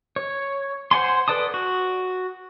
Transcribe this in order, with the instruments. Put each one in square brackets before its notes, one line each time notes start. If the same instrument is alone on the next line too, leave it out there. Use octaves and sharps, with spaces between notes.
[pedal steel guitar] C#5
C5 F#5 G#5 C6
A4 B4 D5 A5 D#6
F#4